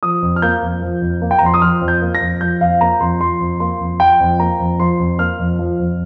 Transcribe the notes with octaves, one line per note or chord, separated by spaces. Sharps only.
F3 D#6
F2
F6
A#3 G6
F2
F3
F2
A#3
G5
A#5
F2 C6
D#6
F3 F6
F2
G6
A#3
A#6
F2
F3 G6
F2 F5
A#3 A#5
F2 C6
F3 C6
F2
A#3 C6
F2
F3 G5
F2
A#3 A#5
F2
F3 C6
F2
A#3 F6
F2
F3
F2